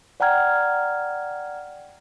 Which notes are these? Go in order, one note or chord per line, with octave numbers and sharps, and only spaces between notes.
D5 F#5 G5 A#5 F6 G#6